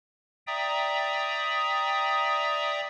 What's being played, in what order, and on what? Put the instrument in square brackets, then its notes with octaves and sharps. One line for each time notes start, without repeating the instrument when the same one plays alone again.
[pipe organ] D5 E5 G5 A#5 D#6